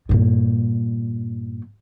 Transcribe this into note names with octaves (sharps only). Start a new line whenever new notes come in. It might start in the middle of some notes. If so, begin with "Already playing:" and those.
G2 A#2